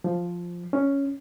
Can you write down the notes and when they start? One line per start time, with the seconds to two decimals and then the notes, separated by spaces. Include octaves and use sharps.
0.04 F3
0.73 C#4